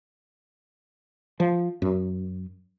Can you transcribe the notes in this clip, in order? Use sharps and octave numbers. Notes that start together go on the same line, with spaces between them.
F3
F#2